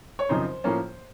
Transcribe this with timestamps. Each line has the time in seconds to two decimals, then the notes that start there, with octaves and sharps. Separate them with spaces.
0.19 C#5
0.29 F#2 C#3 F3 C4 D#4 C5
0.64 A2 F3 A#3 C#4